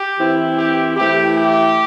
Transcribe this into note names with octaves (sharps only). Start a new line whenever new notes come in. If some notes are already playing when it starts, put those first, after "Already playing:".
Already playing: G4
E3 C4 E4
G4
E3 A3 E4 G4
G4